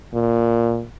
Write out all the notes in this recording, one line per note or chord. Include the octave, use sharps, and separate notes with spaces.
A#2